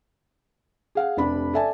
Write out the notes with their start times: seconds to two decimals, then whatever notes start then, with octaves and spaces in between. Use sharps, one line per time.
0.95 G#4 F5 F#5
1.17 F1 C3 D4 B5
1.54 A4 D5 E5 G#5 A5